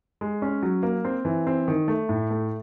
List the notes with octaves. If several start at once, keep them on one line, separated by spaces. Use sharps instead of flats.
G#3
C#4
F#3
A#3
C4
E3
C4
D#3
A3
A2
A3